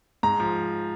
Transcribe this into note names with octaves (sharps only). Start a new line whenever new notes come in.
G#2 A#5
F3